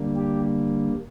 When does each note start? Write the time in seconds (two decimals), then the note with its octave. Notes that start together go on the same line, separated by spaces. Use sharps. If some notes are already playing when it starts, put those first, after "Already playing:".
Already playing: D3 G3 A#3
0.16 G4